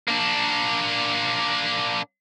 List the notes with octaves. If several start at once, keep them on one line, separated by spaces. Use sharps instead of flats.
A#3 D4